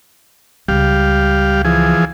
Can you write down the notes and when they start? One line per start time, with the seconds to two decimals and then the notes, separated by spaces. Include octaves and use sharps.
0.68 C#2 G3 G4 F5
1.65 E3 F3 G#4